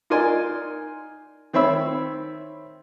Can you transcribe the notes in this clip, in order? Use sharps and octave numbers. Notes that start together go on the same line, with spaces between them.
D#4 F4 A#4 D5 G#5 C6
D#3 C4 C#5 E5 B5 E6